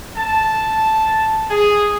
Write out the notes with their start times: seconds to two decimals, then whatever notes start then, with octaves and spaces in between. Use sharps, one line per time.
0.17 A5
1.51 G#4